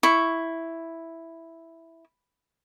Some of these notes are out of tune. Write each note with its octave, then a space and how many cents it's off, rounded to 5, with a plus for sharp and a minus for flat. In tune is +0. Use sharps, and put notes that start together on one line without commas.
E4 +0 C#6 +0